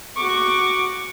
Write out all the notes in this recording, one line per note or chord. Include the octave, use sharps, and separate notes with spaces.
F#4 C#6 D6